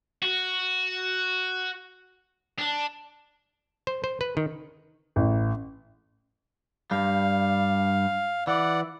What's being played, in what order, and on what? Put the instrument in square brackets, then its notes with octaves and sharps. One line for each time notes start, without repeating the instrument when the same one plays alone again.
[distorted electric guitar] F#4
D4
[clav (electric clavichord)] C5
C5
B4
D#3
[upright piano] A1
[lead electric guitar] G2 G3 [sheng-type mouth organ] F5
[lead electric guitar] E3 [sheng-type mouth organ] D5 F#5